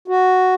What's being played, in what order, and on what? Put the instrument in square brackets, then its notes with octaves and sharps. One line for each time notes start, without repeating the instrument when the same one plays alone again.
[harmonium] F#4